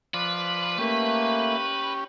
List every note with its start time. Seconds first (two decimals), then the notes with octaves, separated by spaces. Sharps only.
0.14 F3 B4 C5 D5
0.79 A3 A#3 C#4 G4